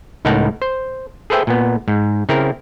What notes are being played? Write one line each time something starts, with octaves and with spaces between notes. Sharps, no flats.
C#2 A2 D#4 A#4 F#5 A5
C5
G#4 A4 B4 C5 E5 G5
A#2 B3
G#2
C#3 C4 E4 A#4